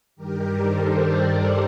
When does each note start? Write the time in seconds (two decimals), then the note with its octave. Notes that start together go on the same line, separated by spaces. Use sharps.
0.16 G2 D#3 G3 G4 A#4
0.58 A4 C5
1.00 A#4 D5